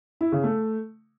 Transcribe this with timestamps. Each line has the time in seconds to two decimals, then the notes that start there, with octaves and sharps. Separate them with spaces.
0.21 E4
0.32 C#3
0.44 A3